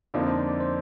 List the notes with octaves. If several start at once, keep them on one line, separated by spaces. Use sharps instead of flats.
F2 D3 F3 A#3 D#4 D5
C5
D5
D5
C5